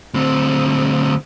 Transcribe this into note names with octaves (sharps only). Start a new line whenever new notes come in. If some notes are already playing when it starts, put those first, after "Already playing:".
D2 C4